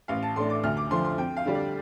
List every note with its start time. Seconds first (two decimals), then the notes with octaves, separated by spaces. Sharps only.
0.08 A1 F5
0.23 A5
0.36 A2 A3 D4 C6
0.50 D6
0.63 D2 F6
0.77 D6
0.91 D3 F3 C6
1.05 C6
1.18 F2 G5
1.37 F5
1.45 D3 G3 D4
1.55 D5